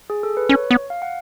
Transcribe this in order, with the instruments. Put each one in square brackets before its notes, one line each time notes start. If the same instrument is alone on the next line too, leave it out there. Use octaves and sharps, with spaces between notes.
[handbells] G#4
A4
B4
[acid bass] C#4 [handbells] C#5
[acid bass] B3
[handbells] F5
F#5